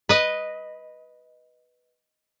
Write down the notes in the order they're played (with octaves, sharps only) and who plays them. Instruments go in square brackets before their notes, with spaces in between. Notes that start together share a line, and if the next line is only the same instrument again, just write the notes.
[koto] B4 D#5